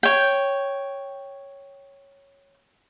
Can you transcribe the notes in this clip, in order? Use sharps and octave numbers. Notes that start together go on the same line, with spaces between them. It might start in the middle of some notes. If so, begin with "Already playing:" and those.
C#5 G5